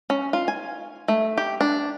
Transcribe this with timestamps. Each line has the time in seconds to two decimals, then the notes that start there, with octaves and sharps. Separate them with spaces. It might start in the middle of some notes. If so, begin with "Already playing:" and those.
0.10 C#4
0.33 F4
0.48 G#5
1.08 A3
1.38 G4
1.61 D4